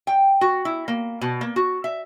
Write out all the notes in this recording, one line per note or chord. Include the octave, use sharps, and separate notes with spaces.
G5
F#4
E4
A#3
B2
A#3
F#4
E5